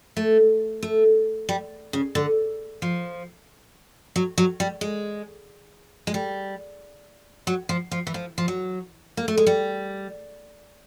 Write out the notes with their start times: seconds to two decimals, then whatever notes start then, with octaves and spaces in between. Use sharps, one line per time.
0.17 A3
0.83 A3
1.49 G3
1.93 C#3
2.15 D3
2.82 F3
4.16 F#3
4.38 F#3
4.60 G3
4.81 G#3
6.07 G#3
6.14 G3
7.47 F#3
7.69 F3
7.91 F3
8.07 E3
8.14 F3
8.38 F3
8.48 F#3
9.17 A#3
9.28 A3
9.37 G#3
9.47 G3